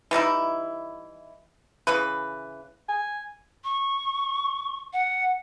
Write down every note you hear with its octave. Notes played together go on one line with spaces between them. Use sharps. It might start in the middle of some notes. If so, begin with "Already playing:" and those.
E3 G3 D#4 E4
C#3 E3 B4
G#5
C#6
F#5